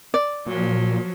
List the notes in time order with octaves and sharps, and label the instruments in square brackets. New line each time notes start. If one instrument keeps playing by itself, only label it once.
[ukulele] D5
[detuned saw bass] A#2 [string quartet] F3 F#3